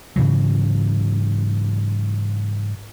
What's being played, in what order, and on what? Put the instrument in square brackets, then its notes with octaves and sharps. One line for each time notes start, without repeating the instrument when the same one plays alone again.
[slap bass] G#2 C#3 E3 F#3